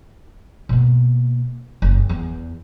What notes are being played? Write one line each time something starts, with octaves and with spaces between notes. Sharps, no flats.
B2 A#3
F#1
E2